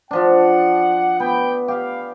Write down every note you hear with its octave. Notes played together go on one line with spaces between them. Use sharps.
F3 D4 F#5
B3 G5
G4 F5